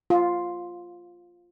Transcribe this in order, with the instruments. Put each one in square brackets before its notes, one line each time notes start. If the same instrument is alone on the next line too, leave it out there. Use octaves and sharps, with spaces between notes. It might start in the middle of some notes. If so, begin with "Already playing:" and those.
[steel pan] F4